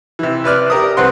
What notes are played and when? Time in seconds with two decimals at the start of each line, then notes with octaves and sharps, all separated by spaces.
0.19 C3 E3
0.44 C3 B4 D5 F6
0.70 G4 A#4 D#6
0.97 C2 C4 B4 F#5 C6